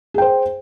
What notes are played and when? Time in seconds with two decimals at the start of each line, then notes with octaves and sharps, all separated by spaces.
0.14 G#4
0.18 G5
0.22 C5